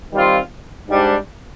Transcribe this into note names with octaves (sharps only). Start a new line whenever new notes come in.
D#3 G3 C4 F4
G#2 G3 D4